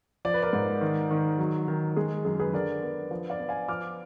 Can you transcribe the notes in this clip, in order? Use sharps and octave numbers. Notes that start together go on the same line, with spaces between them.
F3 D5
B4
A#4 D5
G#2
D#3
D#3
F#3
D#3
G#3 G#4
F#2 G#4
G#4 B4
D3 A#4 D5
B3
F3
D5 F5
B3
F5 G#5
F3 D6 F6